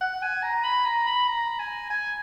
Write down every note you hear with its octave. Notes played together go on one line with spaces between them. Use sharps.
F#5
G#5
A#5
B5
A#5
B5
A#5
G#5
G#5